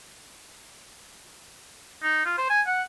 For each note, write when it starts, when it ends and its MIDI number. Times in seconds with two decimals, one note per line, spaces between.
2.03 2.22 63
2.25 2.35 65
2.38 2.46 72
2.50 2.61 80
2.67 2.82 78